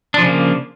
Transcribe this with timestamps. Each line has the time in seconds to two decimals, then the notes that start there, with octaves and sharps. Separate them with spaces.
0.14 D4
0.18 F3
0.22 C#3
0.26 A#3